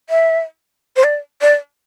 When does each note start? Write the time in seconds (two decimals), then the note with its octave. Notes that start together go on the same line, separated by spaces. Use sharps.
0.10 E5
0.96 C5
1.04 D5
1.42 D5